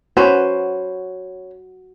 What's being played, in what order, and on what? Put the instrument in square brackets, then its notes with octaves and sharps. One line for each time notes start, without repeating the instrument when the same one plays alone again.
[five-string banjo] C#4 B4 C5 [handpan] F#4